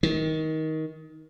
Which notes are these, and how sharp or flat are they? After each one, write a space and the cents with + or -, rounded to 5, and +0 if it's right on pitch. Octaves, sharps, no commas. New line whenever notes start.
D#3 +20